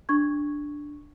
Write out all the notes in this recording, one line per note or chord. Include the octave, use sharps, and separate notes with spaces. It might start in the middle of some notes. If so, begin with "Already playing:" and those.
D4 C#6 G#6